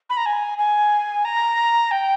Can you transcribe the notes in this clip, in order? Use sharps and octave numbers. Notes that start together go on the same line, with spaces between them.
B5
A#5
G#5
G#5
A#5
G5